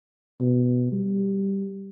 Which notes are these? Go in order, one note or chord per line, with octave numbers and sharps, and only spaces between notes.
B2
G3